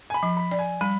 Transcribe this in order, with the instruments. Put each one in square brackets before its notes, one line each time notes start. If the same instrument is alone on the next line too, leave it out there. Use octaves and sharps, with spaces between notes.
[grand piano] G#5
B5
[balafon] F3
[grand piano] B5
[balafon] D5
[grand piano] G#5
[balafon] G3 [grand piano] B5